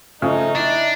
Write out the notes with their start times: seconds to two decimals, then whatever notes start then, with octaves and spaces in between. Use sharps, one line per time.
0.22 C#3 F3 A3 D#4
0.56 D4 E4